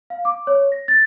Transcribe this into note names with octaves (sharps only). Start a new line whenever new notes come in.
F5
D6
C#5
A#6
A6